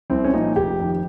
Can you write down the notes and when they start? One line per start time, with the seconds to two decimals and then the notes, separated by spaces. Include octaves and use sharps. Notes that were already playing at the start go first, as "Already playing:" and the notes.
0.10 C2 C4
0.24 C#4
0.33 A#2 F3 D#4
0.56 F1 G4
0.80 F2 D#3